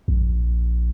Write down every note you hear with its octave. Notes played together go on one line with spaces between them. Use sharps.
A#1